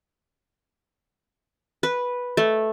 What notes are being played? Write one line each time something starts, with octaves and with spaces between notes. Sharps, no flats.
B4
A3